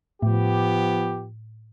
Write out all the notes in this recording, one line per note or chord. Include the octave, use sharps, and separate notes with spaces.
A2 F3 B3 G4